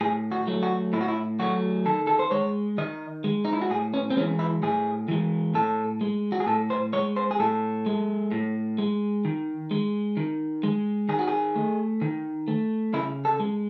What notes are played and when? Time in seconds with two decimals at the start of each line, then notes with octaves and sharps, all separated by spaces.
0.01 A2 G#4
0.32 F#4
0.47 F#3 A3
0.63 F#4
0.93 A2 E4
1.01 F#4
1.08 E4
1.39 F#3 A3 F#4
1.86 D#3 A4
2.07 A4
2.19 C5
2.31 G#3 C#5
2.78 D#3 D#5
3.24 G#3
3.45 D#4
3.53 E4
3.61 F#4
3.70 A2 G#4
3.94 C#4
4.10 C4
4.17 E3 G#3 C#4
4.39 E4
4.62 A2 G#4
5.08 E3 G#3
5.55 A2 A4
6.01 G#3
6.32 F#4
6.40 G#4
6.47 A2 A4
6.70 C5
6.93 G#3 C#5
7.16 C5
7.31 G#4
7.40 A2 A4
7.86 G#3
8.32 A2
8.78 G#3
9.25 D#3
9.71 G#3
10.17 D#3
10.63 G#3
11.09 D#3 G#4
11.19 F#4
11.28 G#4
11.56 A3
12.02 D#3
12.48 A3
12.94 C#3 E4
13.25 A4
13.40 G#3